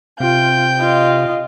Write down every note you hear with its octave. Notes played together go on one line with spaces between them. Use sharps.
C3 F4 G5 G6
F4 D#5